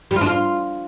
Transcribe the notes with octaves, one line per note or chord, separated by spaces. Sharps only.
G3
F4
D4
F4